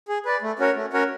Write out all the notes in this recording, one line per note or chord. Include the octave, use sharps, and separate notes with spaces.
G#4
B4 D5
A3
C#4 F#4 A#4 C#5
A3
C#4 F#4 A#4 C#5